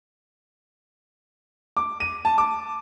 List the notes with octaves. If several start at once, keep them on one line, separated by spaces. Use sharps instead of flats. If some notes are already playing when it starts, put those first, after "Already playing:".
D6
D#7
A5
D6